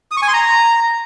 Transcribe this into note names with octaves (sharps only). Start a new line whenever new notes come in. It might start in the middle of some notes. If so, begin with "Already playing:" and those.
D#6
C#6
G#5
C6
A#5